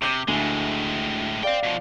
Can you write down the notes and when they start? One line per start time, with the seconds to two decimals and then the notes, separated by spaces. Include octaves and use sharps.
0.02 C3 D6 G6
0.28 D2 A2 G#3 G#5
1.43 C5 D5 F5 G5
1.63 B2 F3